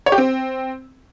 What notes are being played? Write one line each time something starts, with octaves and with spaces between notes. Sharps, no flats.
C#5
G4
C4